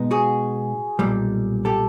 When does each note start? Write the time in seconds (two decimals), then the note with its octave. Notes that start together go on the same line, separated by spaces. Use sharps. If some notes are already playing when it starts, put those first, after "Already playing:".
Already playing: B2 G#3 B3 D#4
0.11 F#4 G#4
0.99 B1 A#2 G3
1.65 G4 A4